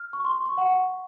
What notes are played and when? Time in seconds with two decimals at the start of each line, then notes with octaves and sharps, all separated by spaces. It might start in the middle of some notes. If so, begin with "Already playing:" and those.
Already playing: F6
0.13 C#6
0.25 C6
0.36 C#6
0.46 C#6
0.57 F#5
0.68 F#5